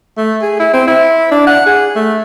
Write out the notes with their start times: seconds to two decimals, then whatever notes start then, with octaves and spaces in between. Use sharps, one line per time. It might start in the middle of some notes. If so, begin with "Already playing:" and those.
0.17 A3
0.42 G#4
0.59 E4
0.73 C4
0.87 E4
1.31 D4
1.47 F#5
1.66 G#4
1.96 A3